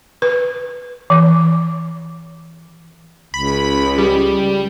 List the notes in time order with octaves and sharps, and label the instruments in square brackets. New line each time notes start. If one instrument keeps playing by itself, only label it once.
[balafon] B4
E3
[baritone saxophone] C#2 [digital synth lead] B5
[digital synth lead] G3